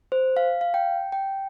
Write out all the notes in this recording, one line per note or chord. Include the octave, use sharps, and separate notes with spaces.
C5
F5
F5
G5
G5